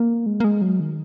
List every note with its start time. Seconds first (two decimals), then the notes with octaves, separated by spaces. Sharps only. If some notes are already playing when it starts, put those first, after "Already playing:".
Already playing: A#3
0.26 G#3
0.40 A#3
0.44 G#3
0.62 F#3
0.80 D#3